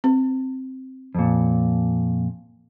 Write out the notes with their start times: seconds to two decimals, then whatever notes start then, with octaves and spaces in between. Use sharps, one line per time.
0.04 C4
1.15 F2 A#2